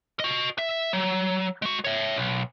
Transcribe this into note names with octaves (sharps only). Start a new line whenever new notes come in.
F#4 D#5
E5
F#3
G#3 F#4
C#5 E5
B1